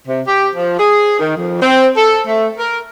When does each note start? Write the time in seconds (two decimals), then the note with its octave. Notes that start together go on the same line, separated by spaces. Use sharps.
0.08 C3
0.27 G4
0.54 F3
0.79 G#4
1.19 D#3
1.37 F2
1.61 C4
1.96 A4
2.27 A3
2.59 A#4